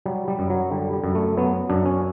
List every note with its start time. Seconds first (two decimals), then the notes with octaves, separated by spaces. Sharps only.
0.06 F#3 G3
0.28 G3
0.39 F#2
0.50 F#3
0.71 D3 G3
0.93 G3
1.04 F#2
1.15 A3
1.37 F#3 B3
1.69 F#2 D4
1.86 C#4